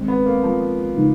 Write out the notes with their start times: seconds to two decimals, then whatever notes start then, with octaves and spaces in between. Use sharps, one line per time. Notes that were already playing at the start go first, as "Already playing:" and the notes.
Already playing: D#3 G#3 C4
0.08 B3
0.26 A#3
0.44 F3
0.96 C#3 F3 G#3 B3 D#4